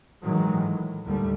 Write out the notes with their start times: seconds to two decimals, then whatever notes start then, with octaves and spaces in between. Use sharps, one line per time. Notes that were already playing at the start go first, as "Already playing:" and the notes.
0.22 G#2 D#3 E3 F#3 G#3
0.54 A2
1.04 D#2 D3 G3 A3